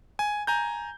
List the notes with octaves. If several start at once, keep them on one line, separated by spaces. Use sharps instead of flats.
G#5
G#5 A#5 G6